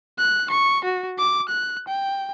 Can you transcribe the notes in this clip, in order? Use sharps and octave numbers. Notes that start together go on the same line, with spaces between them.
F#6
C#6
F#4
D6
F#6
G5